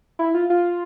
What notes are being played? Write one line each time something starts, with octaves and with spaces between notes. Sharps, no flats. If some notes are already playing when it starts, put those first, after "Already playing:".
E4
F4
F4